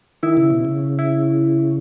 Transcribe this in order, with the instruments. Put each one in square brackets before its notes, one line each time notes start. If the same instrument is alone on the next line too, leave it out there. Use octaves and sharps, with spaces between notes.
[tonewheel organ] D#3 [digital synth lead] E4
[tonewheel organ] C#3
B2
C#3
[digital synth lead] E4